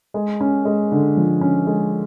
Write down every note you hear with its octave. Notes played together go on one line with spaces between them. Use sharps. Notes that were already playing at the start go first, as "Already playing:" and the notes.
G#3
C#4
G#3
D3
F3
C#4
G#3